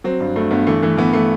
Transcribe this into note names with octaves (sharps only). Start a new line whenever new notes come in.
F#3 C4
G2
G2 A3
G2 B3
E3 A3
E3 A3
E3 B3
E3 A3